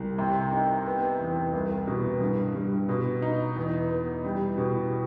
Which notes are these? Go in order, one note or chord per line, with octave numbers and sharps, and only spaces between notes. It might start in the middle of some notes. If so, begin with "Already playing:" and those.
Already playing: C2
C3
D#4
B3
E2
C2
B2
G2
G2
B2
D#4
E2
B3
G3
B2